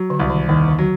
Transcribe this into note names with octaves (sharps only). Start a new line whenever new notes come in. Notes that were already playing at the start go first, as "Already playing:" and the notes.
Already playing: F#3
D3
C2
D#3
D#2 D#3
D3
F#3